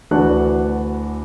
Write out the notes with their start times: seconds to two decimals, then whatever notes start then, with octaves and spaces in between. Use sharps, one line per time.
0.11 D2 E3 D4 F#4 F#6